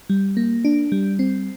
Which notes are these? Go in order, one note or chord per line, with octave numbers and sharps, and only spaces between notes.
G3
A#3
D4
G3
C4